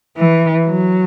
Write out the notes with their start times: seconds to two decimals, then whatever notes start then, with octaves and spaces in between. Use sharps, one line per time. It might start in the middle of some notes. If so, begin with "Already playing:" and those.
0.17 E3
0.66 F#3